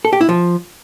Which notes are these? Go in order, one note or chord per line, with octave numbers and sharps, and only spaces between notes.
A4
G4
E4
F3